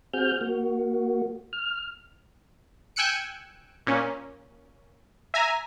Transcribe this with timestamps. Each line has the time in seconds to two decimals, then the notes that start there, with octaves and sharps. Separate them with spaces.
0.13 C4 F#4 G#4 F6 G6
0.41 A#3 F#4
1.53 F6
2.96 G5 G#5 E6 F#6 C#7 D7
3.87 A#2 C#4
5.34 E5 G#5 A#5